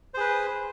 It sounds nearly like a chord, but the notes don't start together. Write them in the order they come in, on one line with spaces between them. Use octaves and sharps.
C5 G#4 B4